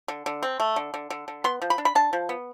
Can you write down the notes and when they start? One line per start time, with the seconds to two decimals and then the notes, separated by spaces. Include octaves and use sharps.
0.08 D3
0.26 D3
0.43 C4
0.60 A3
0.76 D3
0.94 D3
1.10 D3
1.28 D3
1.44 B3 C6
1.62 F3
1.70 B5
1.78 D4
1.85 B5
1.95 D4 A5
2.13 F3
2.29 B3